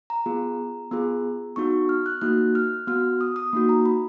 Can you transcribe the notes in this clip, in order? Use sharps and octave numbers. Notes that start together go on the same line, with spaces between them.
A#5
B3 F4 G#4
B3 F4 G#4
B3 D#4 F#4 C#6
F6
F#6
A#3 D#4 F#4 F#6
F6
B3 F#4 F6
D#6
D#6
A#3 D#4 F#4
A#5
B5